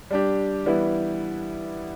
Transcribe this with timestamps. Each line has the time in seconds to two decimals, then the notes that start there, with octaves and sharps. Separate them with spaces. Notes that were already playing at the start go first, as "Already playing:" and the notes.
0.11 G3 D4 G4
0.66 E3 G3 B3 E4